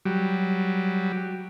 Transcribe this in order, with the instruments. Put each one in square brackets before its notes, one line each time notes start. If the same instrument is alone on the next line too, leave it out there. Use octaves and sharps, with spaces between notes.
[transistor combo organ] F#3 G3